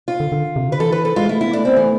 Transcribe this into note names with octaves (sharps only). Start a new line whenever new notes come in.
F4
D3
D3
C3
D3 B4
E3 A4
B4
A4
G#3 F4
A3 E4
B3 E4
A3 D4
B3 C4
E3 A3